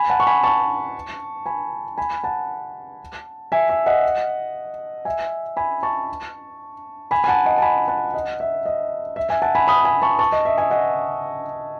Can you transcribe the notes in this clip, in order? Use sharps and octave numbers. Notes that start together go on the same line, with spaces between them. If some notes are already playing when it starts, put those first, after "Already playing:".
Already playing: G#5 B5
F#5 A5
C#6
G#5 B5
A5 C#6
G#5 B5
G#5 B5
F#5 A5
E5 G#5
E5
D#5 F#5
E5 G#5
G#5 B5
A5 C#6
G#5 B5
G#5
F#5 A5
D#5 F#5
A5
G#5 B5
F#5 A5
D#5 F#5
E5
D#5
E5
E5 G#5
F#5 A5
G#5 B5
B5 D#6
G#5 B5
A5 C#6
A5 C#6
D#5
E5
E5 G#5
D#5 F#5